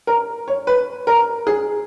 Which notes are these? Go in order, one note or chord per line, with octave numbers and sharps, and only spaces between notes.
A#4
C#5
B4
A#4
G#4